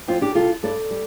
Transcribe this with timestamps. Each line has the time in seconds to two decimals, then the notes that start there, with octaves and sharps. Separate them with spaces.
0.08 F2 C4 F4
0.21 D4 G4
0.35 C3 G3 F4 A4
0.63 G2 A4 D5
0.91 G3